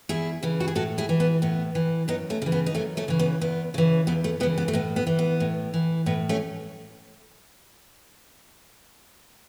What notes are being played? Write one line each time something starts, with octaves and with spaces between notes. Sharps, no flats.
E2 E4 G#4
C#3 E3
F#4
G#4
A2 F#4 A4
E4 G#4
E3
B3
A2 B3
E3
F#2 B3 D#4
A3 C#4
C#3 E3
B3
D#4
F#2 A3 C#4
A3 C#4
C#3 E3
B3
E2 B3
C#3 E3
E2 B3
A3
C#3 E3 B3
B3
A3
A2 B3
B3
E3
B3
A2
E3
A2 B3
A3 C#4